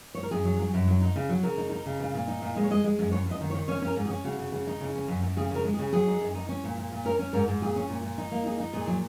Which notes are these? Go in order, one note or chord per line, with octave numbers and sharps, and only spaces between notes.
C#5
A#4
F#2 G#4
F#3
F#3
F#2
F#3
D#4
C#3
F#3
C#3 A#4
D#4
D#4
C#3
A#2
A#2
D#4
A#2
G#3 D#5
C#5
G#3 D#5
G#3
F#2
F#2 C#5
F#2
D#5
D#3
C#5
D#3
C#4 C#5
C#4
A#4
G#2
G#4
C#4
C#3 F#4
C#3
C#3
D#4
C#3
C#4
F#2
F#2
C#3 G#4
C#3 A#4
G#3
G#4
C#3
F#3 G#4
D#4
F#2
D#4
C#4
A#2
A#2
A#2
C#4 A#4
C#4
G#2 A#4
G#2
A#2 G#4
C#4
A#2
A#2
D#4
A#3
D#4 G#4
D#4
A#2 G#4
F#3